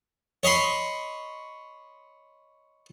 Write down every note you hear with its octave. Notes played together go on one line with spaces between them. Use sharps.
C#5 D#5 B5 C6